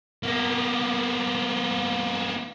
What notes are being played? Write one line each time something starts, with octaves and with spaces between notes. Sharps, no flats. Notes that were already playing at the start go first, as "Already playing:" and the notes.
A#3 B3